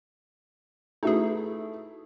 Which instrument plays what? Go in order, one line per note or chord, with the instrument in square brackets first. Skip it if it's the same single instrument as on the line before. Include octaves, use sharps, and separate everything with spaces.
[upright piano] A3 E4 B4 [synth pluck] D#4 F#4 G#4